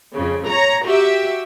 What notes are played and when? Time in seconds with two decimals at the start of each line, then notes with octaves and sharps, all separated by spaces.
0.15 F2 C#3
0.48 C#5 A#5
0.85 F#4 G4 E5